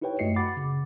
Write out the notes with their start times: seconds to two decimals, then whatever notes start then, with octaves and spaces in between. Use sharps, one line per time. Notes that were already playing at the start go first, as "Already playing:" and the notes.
0.01 D#4 E4 G4 B4 C#5 G5
0.19 F#2 A3 F#4 D#5 C7 C#7
0.36 F#5 B5 D6 A6
0.57 C#3